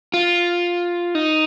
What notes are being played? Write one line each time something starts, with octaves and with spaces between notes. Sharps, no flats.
F4
D#4